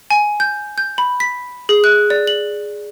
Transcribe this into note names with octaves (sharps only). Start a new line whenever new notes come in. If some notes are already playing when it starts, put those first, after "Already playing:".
G#5
G6
G6
B5
B6
G#4
F#6
D5
F#7